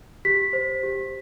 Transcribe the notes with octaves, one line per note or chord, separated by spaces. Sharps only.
G4 B6
C5
G4